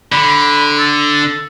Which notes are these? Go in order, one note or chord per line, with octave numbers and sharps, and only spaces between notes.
D3 B5
A4